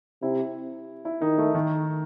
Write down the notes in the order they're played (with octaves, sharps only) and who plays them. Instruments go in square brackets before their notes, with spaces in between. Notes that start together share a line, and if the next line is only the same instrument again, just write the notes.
[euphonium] C3 [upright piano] E4
[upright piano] E4
[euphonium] D#3 [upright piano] D#4
[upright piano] A3
D#3